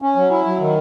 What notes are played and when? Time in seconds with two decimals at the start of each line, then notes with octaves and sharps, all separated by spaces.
0.02 C#4
0.16 F#3
0.31 E4
0.45 F#3
0.60 D#3